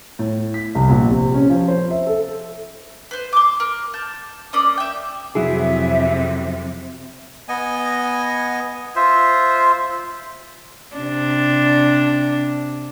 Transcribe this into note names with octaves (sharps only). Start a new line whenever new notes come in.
A2
B6
C2
A#1
C3
C#4
F3
C5
E5
A4
B4 C5
C6 D6
A#4
A5 G6
A#3 C#4 D5 D#6
E5 G5
F2 C3 F#3 E4 G#4 E5
B3 D#5 G#5
F4 C5 E5
C3 D4